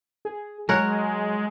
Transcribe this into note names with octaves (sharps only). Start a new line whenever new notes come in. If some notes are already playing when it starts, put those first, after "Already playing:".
G#4
F#3 G#3 A#4 C#5 F#5 G#5